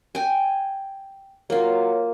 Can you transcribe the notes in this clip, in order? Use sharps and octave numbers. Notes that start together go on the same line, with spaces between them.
G5 G#5
F#3 A#3 F4